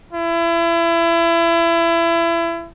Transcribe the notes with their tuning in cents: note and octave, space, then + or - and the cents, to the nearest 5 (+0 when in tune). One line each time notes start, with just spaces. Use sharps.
E4 +30